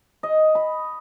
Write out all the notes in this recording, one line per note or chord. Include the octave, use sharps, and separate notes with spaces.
D#5
B5